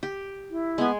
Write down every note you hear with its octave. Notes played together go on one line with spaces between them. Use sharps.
G4
E4
G#3 B3 G#5